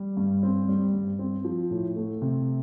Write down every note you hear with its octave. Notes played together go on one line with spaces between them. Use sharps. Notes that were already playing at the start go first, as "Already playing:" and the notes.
Already playing: G3
G2
C4
G3
G2
C4
F3
A2
A3
C3